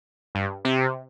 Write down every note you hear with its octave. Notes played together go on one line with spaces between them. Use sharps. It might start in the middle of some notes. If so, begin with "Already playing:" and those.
G2
C3